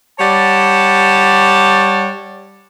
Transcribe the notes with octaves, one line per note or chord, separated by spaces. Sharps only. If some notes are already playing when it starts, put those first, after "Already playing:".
G3 C#5 D5 F#5 A5